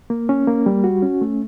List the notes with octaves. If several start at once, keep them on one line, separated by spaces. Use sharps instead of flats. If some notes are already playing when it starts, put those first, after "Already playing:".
A#3
C#4
A#3
G3
F#4
C#4
A3